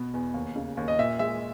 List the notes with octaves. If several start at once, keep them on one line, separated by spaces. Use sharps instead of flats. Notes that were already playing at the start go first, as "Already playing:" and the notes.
Already playing: B2 B3
E2
D#2
C#3
D#2
D#5
A#2 E5
G#3 E5